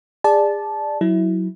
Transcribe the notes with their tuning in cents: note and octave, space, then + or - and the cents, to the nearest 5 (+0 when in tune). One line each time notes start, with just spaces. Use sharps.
G#4 -30 D5 +10 A5 -15
F#3 +0 E4 -15